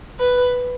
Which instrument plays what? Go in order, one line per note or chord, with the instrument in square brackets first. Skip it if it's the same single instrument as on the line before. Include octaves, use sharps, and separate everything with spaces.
[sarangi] B4